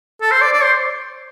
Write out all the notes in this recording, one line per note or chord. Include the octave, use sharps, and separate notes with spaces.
A4
C5
D5
D5
C5